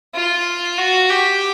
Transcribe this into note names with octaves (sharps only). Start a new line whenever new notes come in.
F4
F#4
G4